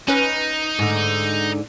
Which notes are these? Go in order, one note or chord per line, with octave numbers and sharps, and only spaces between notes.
C#4 D#4 B4
G#2 D3